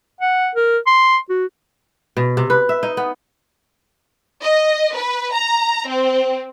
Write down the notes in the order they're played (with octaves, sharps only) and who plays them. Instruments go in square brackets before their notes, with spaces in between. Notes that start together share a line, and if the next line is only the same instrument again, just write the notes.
[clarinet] F#5
A#4
C6
F#4
[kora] B2
C3
B4
E5
D#4
B3
[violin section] D#5
B4
A#5
C4